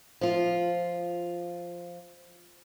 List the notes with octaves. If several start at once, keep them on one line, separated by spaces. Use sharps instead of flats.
F3 F4